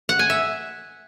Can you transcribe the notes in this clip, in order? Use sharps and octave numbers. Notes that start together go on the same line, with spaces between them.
F#5
G#5
E5